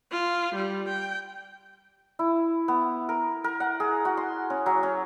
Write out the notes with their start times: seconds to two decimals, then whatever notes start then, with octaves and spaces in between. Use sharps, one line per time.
0.11 F4
0.55 G3
0.89 G5
2.19 E4
2.68 B3
3.09 A#4
3.44 A#4
3.60 F#5
3.80 G#4
4.05 F#4
4.17 C6
4.50 C#4
4.66 F#3
4.83 C#4